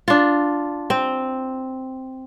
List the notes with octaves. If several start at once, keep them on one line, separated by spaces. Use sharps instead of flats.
D4 F4
C4